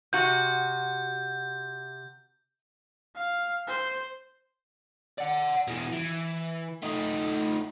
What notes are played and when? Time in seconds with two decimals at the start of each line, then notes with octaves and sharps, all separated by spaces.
0.13 C3 F#4 G6
3.15 F5
3.68 C5
5.18 D5 F#5
5.67 B2 E3
5.92 E3
6.83 A3 D#4